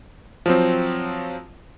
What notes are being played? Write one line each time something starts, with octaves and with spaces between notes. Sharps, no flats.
F3 F#3 C4